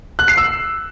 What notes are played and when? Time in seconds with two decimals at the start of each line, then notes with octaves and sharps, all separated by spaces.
0.19 F#6
0.28 C7
0.37 E6